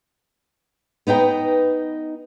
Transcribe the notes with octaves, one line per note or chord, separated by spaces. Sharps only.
B3 D#4 B4 G5